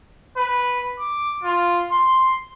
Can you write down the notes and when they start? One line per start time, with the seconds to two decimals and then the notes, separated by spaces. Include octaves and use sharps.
0.37 B4
0.99 D6
1.44 F4
1.92 C6